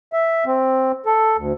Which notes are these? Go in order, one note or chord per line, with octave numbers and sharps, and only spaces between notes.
E5
C4
A4
D2